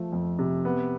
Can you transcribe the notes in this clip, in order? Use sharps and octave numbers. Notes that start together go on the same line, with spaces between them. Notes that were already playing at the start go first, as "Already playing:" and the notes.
Already playing: F3 A3
F2
C3
B3